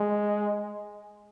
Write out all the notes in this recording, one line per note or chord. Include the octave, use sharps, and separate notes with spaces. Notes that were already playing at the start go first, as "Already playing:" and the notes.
Already playing: G#3